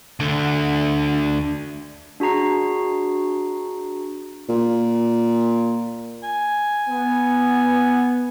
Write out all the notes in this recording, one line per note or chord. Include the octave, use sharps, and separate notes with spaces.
D2 D3
D4 F#4 G#4 A#5 C7
A#2
G#5
B3